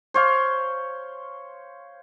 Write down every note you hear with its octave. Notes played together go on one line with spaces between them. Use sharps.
C5 C#5 F5